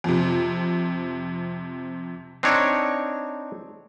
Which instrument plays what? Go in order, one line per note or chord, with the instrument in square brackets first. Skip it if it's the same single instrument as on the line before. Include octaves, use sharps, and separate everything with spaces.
[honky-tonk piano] F2 C3
[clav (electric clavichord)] C4 D4 D#4 C#5